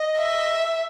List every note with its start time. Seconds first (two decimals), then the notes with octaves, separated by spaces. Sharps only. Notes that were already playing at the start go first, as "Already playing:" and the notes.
Already playing: D#5
0.19 E5